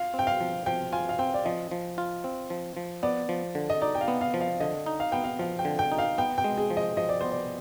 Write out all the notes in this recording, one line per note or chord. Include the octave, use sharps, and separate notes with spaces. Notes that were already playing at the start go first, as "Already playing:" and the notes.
Already playing: F4 F5
C4
G5
F5
F3
F3 G5
F4 G#5
F5
C4 G5
D5
F3 D#5
F3
F4
C4
F3
F3
B3 D5
F3
D3
D#5
D#4 D5
G5
F5
B3
F5
F3
F5
D3 D#5
D#4
F5
B3 G5
F5
F3 F5
G5
D3
G5
D#4
F5
B3 G5
G5
G#3
G#4
F3
D#5
F3 D#5
D5
B3 C5
D5